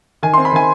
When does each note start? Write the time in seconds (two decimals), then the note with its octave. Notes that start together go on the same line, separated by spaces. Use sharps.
0.23 D#3 G#5
0.34 C6
0.38 C4
0.45 B5
0.52 D#3 G#5